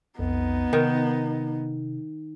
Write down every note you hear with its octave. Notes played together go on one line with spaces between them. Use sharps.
B1 F2 B3 D#4
C3 D#3